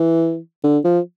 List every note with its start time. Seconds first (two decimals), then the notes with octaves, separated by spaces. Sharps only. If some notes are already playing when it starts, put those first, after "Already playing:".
Already playing: E3
0.64 D3
0.85 F3